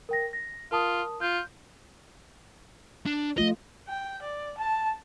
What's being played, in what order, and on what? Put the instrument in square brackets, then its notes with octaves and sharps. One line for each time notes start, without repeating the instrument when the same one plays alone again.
[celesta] A#4 G5 A#6
A#6
[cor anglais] F4 [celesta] A#4 A5 D#6
[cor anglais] F4 [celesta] G6
[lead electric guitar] D4
[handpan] F3 A3 F4 [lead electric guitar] D#5
[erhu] G5
D5
A5